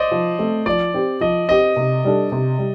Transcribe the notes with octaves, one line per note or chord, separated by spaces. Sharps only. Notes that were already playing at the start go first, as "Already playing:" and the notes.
Already playing: C5 D5 D#5
F3
A3 C4
F3 D5
C4 G4
F3 D#5
C4 G4 D#5
C3
G3 D4 A4
C3
G3